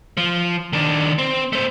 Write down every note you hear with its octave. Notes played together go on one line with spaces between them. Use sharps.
F3
D#3 D4
C4
A3 C5